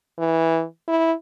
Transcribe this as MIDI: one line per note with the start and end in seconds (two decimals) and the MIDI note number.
0.19 0.64 52
0.88 1.13 64